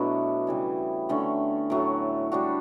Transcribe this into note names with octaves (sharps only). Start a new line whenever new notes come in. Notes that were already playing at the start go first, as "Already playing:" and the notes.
Already playing: B2 F#3 A3 B3 D4 E4
C#3 E3 G3
D3 A3 C#4
A2 F#3 A3
G3 D4 F#4